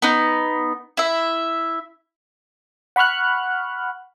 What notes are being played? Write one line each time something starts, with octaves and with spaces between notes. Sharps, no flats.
B3 D#4
E4 E5
F#5 B5 C#6 F6 F#6